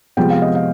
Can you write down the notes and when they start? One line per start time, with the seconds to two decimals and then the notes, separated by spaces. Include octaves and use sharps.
0.17 C3 F3 G#3 B3 G5
0.30 F5
0.42 D#5
0.55 F5